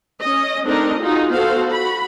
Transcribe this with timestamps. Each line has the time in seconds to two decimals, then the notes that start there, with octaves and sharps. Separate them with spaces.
0.21 C#4 D#5
0.64 A3 C4 D4 D#4 A#4 D#5
1.00 D#4 F4 F#4 G#4
1.31 B3 F#4 A4 C5 F5
1.71 F#4 B5